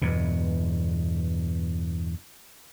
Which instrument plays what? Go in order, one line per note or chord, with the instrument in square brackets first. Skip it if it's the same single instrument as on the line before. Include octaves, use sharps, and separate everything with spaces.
[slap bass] E2 G2 B2